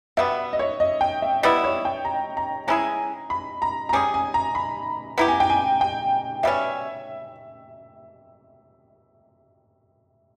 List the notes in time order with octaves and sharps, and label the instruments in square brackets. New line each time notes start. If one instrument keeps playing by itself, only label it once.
[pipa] B2 G3 B3 [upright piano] E5
[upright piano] D#5
C#5
D#5
G5
E5
[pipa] G3 B3 E4 [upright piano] D#5
[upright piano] C#5
G5
A#5
A#5
[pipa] G#3 C#4 E4 G#4 [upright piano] A#5
[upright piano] B5
A#5
A#5
[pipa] G3 C#4 G#4 [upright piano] G#5
[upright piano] G#5
A#5
B5
[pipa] B3 E4 G4 [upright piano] A#5
[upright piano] G#5
G5
G#5
G5
[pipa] B2 G3 C#4 [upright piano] E5